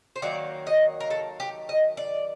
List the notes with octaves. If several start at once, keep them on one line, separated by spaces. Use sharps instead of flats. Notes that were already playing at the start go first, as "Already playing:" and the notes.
C5
D#3 F#3 A#3 D5
D#5
A#4
A4
G4
D#5
D5